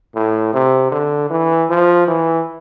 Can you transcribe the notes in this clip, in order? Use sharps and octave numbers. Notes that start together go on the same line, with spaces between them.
A2
C3
D3
E3
F3
E3